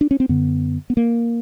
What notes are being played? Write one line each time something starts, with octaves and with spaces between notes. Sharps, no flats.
D4
C#4
C4
F#2 D3 B3
B3
A#3